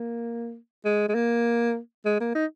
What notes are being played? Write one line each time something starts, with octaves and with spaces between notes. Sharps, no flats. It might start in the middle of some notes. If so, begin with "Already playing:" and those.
Already playing: A#3
G#3
G#3
A#3
G#3
A#3
D#4